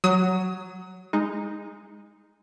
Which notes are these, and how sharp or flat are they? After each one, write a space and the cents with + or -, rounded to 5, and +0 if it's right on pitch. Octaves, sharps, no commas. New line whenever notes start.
F#3 +5 D#6 +40
G#3 -20 D#4 +0